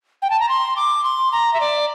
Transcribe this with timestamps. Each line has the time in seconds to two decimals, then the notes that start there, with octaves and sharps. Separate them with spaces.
0.22 G5
0.30 A5
0.40 A#5
0.49 C6
0.76 D6
1.04 C6
1.32 A#5
1.54 E5
1.60 D5